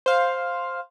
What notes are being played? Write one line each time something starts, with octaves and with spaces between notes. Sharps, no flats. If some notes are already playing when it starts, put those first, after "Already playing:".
C5 F5